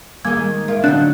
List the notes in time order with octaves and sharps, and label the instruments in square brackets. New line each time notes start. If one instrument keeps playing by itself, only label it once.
[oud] D#3 G#3 [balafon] G3 A#3 D6 [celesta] G#6
[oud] F4 [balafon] A#4 E5
[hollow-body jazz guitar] D2 D4 [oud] F#3 D#4 F#4 [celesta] F#6